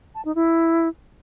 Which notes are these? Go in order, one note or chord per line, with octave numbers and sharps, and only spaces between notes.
A5
D#4
E4